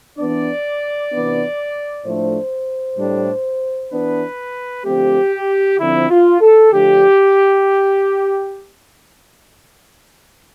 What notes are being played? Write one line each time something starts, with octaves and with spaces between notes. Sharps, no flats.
E3 B3 D4 D5
C3 E3 B3 D4
A2 F3 A3 D4 C5
A2 G3 D4
E3 B3 D4 B4
D3 F3 A3 C4 G4
D3 F3 C4 E4
F4
A4
D3 F3 A3 D4 G4